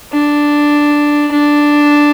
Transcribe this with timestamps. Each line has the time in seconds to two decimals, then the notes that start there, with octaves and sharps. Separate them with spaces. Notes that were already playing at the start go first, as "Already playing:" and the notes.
0.13 D4
1.32 D4